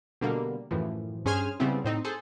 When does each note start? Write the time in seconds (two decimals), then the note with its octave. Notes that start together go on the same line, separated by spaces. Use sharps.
0.21 B2 D3 G3 A#3
0.71 F#2 A2 E3 F3
1.25 G2 C#4 G#4 C5 G#5 F6
1.60 C#3 G3 B3 C4 E4
1.84 A2 C4 D#4
2.05 G#4 A4 C5